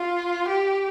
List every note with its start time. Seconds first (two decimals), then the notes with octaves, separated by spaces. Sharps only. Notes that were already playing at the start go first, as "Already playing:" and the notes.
Already playing: F4
0.48 G4